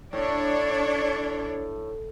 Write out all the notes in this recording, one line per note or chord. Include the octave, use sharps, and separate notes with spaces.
A2 D4 C#5 D5